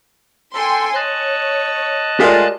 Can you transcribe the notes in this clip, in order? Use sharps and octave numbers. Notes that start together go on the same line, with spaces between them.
A4 G5 G#5 C6
C#5 D#5 A5 F#6
G#3 A3 F4 G4 A#4 D5